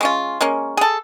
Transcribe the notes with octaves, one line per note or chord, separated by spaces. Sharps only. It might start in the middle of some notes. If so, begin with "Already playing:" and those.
G#3 C#4 F4
G#3 A#3 C#4
G#4 A4